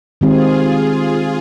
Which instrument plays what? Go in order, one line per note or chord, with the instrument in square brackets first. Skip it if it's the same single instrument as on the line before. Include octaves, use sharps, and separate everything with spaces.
[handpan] D#3 G#3 C4 G4 [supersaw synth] F4 G#4